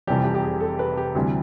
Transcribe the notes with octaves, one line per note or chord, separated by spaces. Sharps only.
F1 F2 C3 E3 G3 G4
G4
G4
G#4
A4
B4
G4
D2 C3 E3 G3